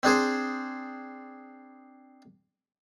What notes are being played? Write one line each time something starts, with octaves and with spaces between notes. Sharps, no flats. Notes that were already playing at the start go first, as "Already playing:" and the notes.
C4 D4 G#4 C5